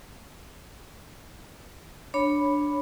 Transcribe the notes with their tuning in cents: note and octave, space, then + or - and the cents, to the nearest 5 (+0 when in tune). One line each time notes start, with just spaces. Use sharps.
D4 +0 C#5 +0 B5 +0